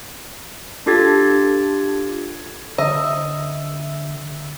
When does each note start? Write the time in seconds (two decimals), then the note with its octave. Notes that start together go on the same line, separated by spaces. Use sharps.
0.86 D4 F4 G4 A4 G#6 A6
2.78 D3 D#5 E5